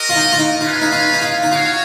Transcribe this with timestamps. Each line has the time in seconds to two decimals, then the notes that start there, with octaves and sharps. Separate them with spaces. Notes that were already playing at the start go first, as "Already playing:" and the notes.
Already playing: F#4 A#4 D#5
0.09 F4
0.16 D#4
0.33 F4
0.39 D#4
0.61 C#4 F4 G#4 B4 F5
0.82 D#4
0.92 F4
1.13 D#4
1.22 F4
1.43 D#4
1.52 F4 F#4 C#5 F5